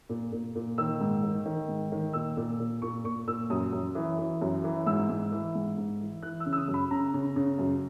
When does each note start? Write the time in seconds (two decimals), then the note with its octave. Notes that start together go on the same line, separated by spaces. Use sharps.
0.09 A#2
0.32 A#2
0.55 A#2
0.78 D#3 E6
1.01 G#2
1.23 D#3
1.46 D#3
1.69 G#2
1.92 D#3
2.13 A#2 E6
2.37 A#2
2.59 A#2
2.82 A#2 C#6
3.04 A#2 C#6
3.27 A#2 E6
3.50 F#2 D#6
3.73 F#2
3.95 E3
4.18 E3
4.42 F#2
4.64 E3
4.86 G#2 E6
5.09 G#2
5.32 E3
5.55 G#2
5.78 G#2
6.00 E3
6.23 E3 F#6
6.40 E6
6.46 C#3
6.53 E6
6.57 D#6
6.68 F#2
6.74 B5
6.91 C#3 A#5
7.14 C#3
7.36 C#3
7.59 F#2